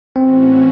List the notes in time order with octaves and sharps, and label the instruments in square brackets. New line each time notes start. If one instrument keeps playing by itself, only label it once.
[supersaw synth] A2 E3 A3 C#4 F#4 [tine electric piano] C4